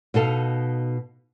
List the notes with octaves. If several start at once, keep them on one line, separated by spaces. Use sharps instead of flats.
B2 D#4 A4 F5